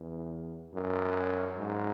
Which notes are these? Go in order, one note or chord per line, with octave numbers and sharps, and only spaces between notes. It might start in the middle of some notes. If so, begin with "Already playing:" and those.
Already playing: E2
F#2
G#2